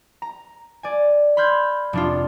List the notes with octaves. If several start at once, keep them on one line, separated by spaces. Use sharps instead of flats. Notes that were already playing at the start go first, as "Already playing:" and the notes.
A#5
D5 G#5
B5 C6 F6 G6 G#6
F1 D4 F4